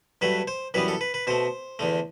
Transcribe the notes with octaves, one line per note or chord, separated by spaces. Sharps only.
G2 F#3 A3 B4
C5
F#2 E3 G3 B3 B4
A4
B4
B4
B2 A3 C5
E2 D3 A3